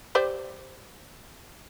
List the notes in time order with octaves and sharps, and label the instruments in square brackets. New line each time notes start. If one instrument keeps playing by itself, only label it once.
[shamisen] G4 C5 D5